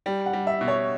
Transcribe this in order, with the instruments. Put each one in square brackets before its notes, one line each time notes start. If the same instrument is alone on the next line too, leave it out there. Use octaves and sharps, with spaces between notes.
[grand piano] G3 [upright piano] G5
[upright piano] F#5
[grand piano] G3
[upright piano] E5
[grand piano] B2
[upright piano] C#5